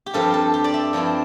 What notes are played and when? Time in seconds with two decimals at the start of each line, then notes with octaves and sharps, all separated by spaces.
0.06 G4
0.14 G2 F3 C4 A4
0.34 A4
0.54 G4
0.64 D5
0.74 E5
0.93 G2 F3 C4 E4